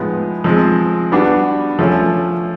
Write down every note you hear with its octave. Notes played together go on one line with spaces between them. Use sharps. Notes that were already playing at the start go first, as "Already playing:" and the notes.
Already playing: A2 F3 G#3 B3 D#4
F3 G#3 C4
G3 B3 D4 F#4
F3 A3 C#4